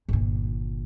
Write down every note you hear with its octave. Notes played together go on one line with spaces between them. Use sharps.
G1 A#2